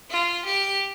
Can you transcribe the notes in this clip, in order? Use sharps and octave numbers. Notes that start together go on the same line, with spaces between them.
F4
G4